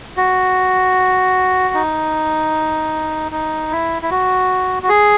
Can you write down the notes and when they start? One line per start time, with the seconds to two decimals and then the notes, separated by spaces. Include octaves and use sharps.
0.17 F#4
1.75 D#4
3.32 D#4
3.72 E4
4.02 E4
4.11 F#4
4.83 F#4
4.89 G#4